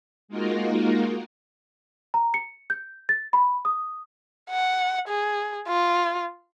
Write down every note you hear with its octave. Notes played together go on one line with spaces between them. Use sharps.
G#3 A#3 D#4 F4 F#4 A#4
A#5
C#7
G6
A6
B5
D#6
F#5
G#4
F4